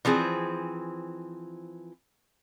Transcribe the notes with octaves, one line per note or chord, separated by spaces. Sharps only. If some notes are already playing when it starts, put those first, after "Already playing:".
E3 F3 C4 G#4